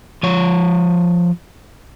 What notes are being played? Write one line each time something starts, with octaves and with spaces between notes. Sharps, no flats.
F3 C#5